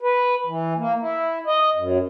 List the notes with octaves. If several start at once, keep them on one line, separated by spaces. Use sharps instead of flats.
B4
E3
A#3
E4
D#5
F#2